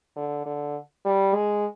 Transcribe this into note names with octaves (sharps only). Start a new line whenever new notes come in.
D3
D3
G3
G#3